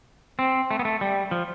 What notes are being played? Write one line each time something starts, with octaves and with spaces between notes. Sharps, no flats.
C4
A3
B3
A3
G3
F3